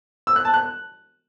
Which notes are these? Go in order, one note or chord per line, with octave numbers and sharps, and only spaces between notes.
E6
F#6
A5
F#6